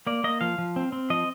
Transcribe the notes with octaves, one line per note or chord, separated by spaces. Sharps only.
A#3 D5
A#3 D#5
F3 F5
F3
C4
C4
F3 D#5